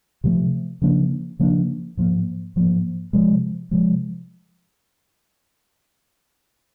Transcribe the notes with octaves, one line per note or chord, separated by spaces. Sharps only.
C3 F3 A3
C#3 F3 A#3 D4
C#3 F3 A#3 D4
G#2 F3 A#3
G#2 F3 A#3
C3 F3 G#3
C3 F3 G#3